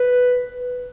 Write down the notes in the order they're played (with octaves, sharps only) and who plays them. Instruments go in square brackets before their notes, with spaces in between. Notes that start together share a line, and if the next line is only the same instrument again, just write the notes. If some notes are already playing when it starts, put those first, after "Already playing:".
Already playing: [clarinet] B4